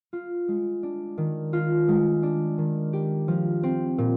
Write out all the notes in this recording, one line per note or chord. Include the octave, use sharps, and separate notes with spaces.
F4
G#3
D4
D#3
F4
G#3
D4
D#3
G4
F3
C4
A#2